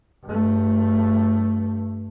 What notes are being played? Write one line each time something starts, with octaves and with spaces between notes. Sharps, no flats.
G2 A3